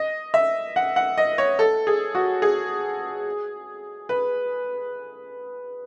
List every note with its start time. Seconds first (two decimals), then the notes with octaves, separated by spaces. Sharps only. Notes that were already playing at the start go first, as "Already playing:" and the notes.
Already playing: D#5
0.34 E5
0.76 F#5
0.96 F#5
1.18 D#5
1.38 C#5
1.59 A4
1.87 G#4
2.15 F#4
2.42 G#4
4.09 B4